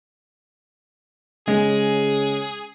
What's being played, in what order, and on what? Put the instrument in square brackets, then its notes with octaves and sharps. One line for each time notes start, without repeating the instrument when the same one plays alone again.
[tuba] C#3 [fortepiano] G#3 [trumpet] G#4